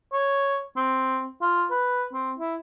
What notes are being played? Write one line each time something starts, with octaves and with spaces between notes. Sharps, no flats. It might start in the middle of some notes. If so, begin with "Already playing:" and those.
C#5
C4
F4
B4
C4
E4